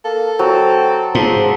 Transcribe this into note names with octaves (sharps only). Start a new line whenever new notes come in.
A#3 A4
F#3 C4
G#2 F3